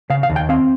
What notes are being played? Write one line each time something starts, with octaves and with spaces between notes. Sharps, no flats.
C#3 F5
F5
D#2
G5
C4 F5